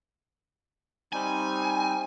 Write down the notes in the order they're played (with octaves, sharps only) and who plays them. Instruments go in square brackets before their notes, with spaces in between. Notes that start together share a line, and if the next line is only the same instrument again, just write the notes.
[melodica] G3 C4 D#4 [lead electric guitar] G#5